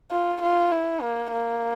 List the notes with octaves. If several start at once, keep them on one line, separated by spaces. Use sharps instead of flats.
F4
F4
E4
A#3
A#3